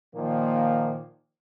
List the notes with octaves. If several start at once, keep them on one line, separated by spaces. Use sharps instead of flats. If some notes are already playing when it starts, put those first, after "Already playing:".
A#2 D#3 F3 A#3